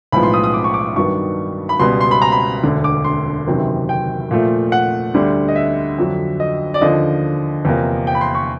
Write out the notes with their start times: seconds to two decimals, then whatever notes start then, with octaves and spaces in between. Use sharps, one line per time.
0.12 B1 A2 F3 G#3 B3 B5
0.23 C6
0.34 D#6
0.44 D#6
0.54 D6
0.64 C#6
0.74 D6
0.96 G2 D#3 F#3 B3 D4 C#6
1.69 B5
1.79 C#2 B2 G3 B3 C6
2.01 C6
2.11 B5
2.22 A#5
2.32 B5
2.63 E1 D2 D3
2.84 D6
3.05 C6
3.47 F#1 E2 C3 D#3 F#3
3.89 G5
4.31 A#2 F3 A3
4.72 F#5
5.14 D2 D3 G3
5.48 D#5
5.55 E5
5.98 F2 D3 F#3
6.40 D#5
6.74 D5
6.81 D#2 D3 F3 D#5
7.65 E2 C3 F3 A#3
8.07 G5
8.15 B5
8.21 C6
8.35 C#6